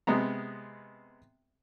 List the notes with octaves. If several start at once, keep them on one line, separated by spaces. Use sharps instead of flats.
C3 G#3 B3 A#5